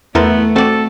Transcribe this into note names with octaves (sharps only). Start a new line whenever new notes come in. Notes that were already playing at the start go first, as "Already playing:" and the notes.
E2 A3 B3 E4 A4 A#4 C5 A6
C4 F#4 A4 D5